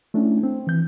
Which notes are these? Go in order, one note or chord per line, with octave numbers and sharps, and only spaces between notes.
A3 C#4 D4 E4
C4
E3 G6